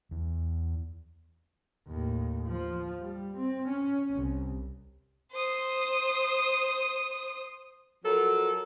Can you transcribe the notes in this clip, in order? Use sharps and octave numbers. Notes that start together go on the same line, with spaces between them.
E2
D#2 A2
F3
G3
C4
C#4
C2
C5 D#6
F3 F#3 A4 A#4